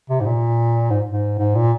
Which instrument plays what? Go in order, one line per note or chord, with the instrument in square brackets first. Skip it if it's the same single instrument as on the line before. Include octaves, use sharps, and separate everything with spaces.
[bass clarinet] C3
G#2
A#2
G#2
G#2
G#2
A#2